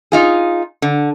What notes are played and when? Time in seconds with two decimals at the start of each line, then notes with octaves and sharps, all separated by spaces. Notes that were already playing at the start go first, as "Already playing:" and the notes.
0.12 D#4 F4 G#4
0.82 D3